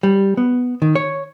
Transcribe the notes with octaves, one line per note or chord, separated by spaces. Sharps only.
G3
B3
D#3
C#5